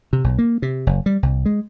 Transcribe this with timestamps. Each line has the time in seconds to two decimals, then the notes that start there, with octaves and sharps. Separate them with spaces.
0.13 C3
0.24 B1
0.39 A#3
0.62 C3
0.87 F#1
1.06 G3
1.23 C2
1.46 G#3